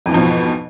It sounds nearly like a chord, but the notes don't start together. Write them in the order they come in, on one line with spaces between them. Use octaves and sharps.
F2 E3 G#2 F3 B2